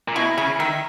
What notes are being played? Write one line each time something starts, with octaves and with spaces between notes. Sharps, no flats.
A#2
B2 E4
C#3 E4
D#3 E5